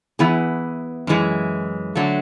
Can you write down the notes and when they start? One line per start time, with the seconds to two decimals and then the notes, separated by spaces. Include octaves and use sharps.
0.19 E3 B3 E4 G#4
1.07 F#2 E3 G#3
1.96 D3 F#3 A3